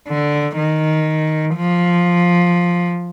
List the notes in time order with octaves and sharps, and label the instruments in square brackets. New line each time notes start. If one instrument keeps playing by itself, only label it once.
[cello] D3
D#3
F3